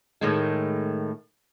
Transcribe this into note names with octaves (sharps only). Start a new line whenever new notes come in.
A2 D#3 G#3